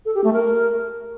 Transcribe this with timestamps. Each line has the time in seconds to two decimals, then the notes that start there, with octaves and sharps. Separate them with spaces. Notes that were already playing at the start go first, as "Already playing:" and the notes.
0.05 A4
0.15 G4
0.24 A3
0.33 A#4